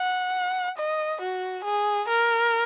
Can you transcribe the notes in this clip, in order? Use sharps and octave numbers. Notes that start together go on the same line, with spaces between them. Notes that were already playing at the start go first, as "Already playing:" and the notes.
Already playing: F#5
D#5
F#4
G#4
A#4